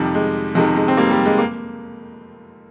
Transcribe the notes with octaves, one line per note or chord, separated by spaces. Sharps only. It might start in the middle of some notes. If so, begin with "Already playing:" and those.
Already playing: F2 C3 D#3 G3
G#3
F2 C3 D#3 G#3
G#3
C4
G3 A#3
G3
G#3
A#3